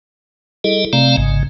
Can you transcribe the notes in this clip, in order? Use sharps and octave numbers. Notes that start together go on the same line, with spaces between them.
G3 E4 G#4 A4 D#5
C3 A3 C4 D5 F5 A#5
G#1 G#2 C#3